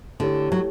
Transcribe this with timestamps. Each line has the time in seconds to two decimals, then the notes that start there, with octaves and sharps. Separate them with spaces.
0.20 D3 A3 E4 G4 C#5
0.52 F#3